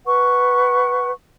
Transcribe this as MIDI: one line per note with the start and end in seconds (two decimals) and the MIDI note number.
0.05 1.11 71
0.05 1.11 78
0.05 1.11 85